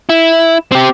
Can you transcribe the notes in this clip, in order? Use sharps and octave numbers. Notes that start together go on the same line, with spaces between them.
E4
C4 G4